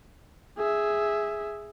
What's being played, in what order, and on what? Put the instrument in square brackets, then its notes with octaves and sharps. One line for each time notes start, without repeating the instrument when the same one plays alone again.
[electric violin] G#4 E5